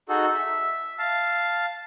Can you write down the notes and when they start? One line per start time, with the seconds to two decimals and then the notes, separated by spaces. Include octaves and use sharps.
0.09 D#4 F#4 G#4 A4
0.34 E5
0.99 F5 A5